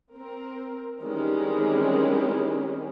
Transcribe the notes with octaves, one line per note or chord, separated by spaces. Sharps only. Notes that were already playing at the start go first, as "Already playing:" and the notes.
C4 A#4
D#3 E3 G3 G#3 C4 C#4